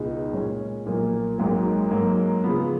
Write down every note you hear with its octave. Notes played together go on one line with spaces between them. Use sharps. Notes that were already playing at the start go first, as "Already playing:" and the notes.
Already playing: C#2 B2 G#3 D#4 G#4
A#2 G#3 C#4
B1 A#2 F3 A#3
G#1 G#2 F#3 A#3
G#2 F#3 A#3
C#3 F3 B3